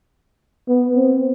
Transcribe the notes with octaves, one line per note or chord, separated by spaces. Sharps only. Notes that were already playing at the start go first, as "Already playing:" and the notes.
B3
C4